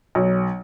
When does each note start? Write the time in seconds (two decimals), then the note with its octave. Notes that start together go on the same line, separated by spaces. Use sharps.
0.15 B1